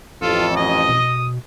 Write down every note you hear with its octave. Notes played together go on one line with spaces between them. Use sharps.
A1 F2 F4 A4
D#5 D#6
B2